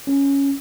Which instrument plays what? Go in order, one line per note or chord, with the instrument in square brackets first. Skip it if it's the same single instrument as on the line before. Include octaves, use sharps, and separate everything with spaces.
[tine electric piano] C#4